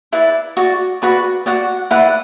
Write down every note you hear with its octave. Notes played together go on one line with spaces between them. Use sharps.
E4 B4 D5
F#4 D5
F#4 B4 D5
F#4 D5 F#5
E4 B4 D5 F#5